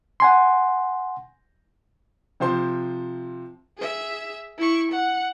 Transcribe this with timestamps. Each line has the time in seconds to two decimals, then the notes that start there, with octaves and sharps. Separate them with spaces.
0.20 F#5 G#5 C6
2.40 C3 F3 C5 C6
3.78 G#4 E5
4.58 E4 C#6
4.92 F#5